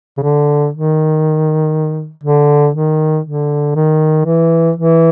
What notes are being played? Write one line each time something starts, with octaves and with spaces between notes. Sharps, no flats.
C#3
D3
D#3
D3
D#3
D3
D#3
E3
E3